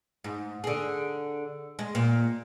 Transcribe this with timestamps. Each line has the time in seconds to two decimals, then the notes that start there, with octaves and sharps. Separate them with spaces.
0.24 G#2
0.64 D3 G#4
1.79 G#3
1.95 A#2